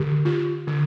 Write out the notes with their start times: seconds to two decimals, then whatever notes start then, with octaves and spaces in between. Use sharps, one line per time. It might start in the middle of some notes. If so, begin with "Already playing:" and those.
Already playing: D3 G4
0.25 F4
0.67 D3